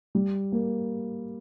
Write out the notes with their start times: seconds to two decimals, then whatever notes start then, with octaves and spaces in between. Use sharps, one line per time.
0.15 G3
0.52 A#3